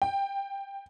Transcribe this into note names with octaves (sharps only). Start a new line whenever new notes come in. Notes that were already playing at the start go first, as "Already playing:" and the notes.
G5